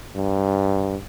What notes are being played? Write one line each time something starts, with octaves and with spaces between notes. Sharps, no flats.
G2